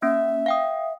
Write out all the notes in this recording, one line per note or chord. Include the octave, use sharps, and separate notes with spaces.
A#3 C#4 E5
F5 G5 D#6